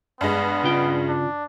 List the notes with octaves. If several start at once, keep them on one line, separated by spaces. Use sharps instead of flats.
G2 G#3 B3
C#3 F4 G5
D4